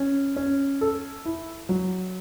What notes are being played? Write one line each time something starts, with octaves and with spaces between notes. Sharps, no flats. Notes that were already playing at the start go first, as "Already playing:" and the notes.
Already playing: C#4
C#4
A4
E4
F#3